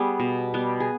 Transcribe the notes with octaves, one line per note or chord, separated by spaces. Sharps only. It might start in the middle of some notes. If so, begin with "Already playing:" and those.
Already playing: G3 B3 G#4
B2
G3 B3
G#4